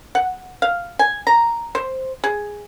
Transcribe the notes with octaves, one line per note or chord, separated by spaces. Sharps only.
F#5
F5
G#5
A#5
C5
G#4